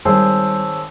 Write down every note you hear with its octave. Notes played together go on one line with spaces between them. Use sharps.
G#1 G3 G#4 C5 C#5 A5 E6